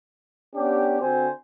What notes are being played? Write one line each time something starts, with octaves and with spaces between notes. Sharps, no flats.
B3 C#4 D4 G4
D3 C4 F#4 C5 G#5